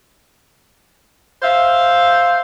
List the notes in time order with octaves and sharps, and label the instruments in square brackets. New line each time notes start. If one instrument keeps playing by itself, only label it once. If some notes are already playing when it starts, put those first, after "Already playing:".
[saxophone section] C5 E5 F5